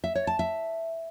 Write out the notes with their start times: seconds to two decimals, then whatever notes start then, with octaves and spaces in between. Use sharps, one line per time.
0.04 E5
0.15 C#5
0.27 A5
0.39 E5